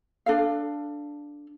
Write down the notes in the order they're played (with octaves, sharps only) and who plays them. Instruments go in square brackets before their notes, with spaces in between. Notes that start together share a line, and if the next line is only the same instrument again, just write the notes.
[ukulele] D4 A4 F5